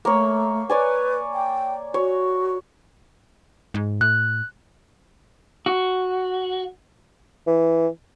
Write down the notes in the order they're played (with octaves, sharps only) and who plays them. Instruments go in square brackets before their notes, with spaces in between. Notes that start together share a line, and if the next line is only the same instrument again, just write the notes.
[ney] A3 [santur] A#3 C#5
[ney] B4 [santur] C#5 D5 G#5
[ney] G5
[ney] F#4 [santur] C#5
[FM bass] G#2
[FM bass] A2 [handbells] F#6
[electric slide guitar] F#4
[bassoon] E3